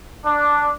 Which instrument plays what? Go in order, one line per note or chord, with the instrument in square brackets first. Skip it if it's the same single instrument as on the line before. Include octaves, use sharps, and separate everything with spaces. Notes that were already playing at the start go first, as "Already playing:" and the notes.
[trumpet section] D4